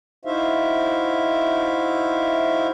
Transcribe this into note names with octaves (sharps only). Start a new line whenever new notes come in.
D#4 E4 F#4 C5 E5 F5